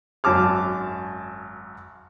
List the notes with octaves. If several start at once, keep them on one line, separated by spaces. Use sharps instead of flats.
G#1 F#2 A5 D6 F6